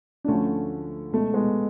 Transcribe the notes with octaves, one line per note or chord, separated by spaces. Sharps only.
D4
D2 D3 F3 A3 C#4
C#2 B2 A3
G#3 B3